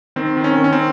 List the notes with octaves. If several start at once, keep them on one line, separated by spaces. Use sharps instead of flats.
D#3 C4
D#3
C#4
D#3
C#4
C4